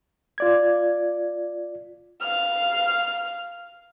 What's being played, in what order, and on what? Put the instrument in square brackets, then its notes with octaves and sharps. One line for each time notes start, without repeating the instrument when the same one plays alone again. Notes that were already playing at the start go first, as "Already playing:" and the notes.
[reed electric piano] F4 D5 G#6
[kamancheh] F5 F6